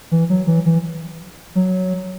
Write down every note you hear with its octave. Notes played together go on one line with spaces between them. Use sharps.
E3
F#3
E3
E3
F#3